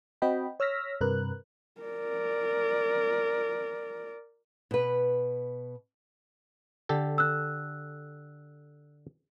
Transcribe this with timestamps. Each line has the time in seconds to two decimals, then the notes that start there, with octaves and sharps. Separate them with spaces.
0.22 C4 F#4 D#5 G5 B5
0.60 C#5 E6 F6 A#6 B6
1.01 G2 C3 A#4 B4 F#6
1.81 A#4 D5
4.71 B2 B4
6.89 D3 G4 A4
7.18 E6 F#6